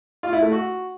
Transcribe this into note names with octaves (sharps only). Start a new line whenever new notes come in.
F4
E4
A3
F#4